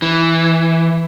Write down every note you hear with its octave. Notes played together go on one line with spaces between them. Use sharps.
E3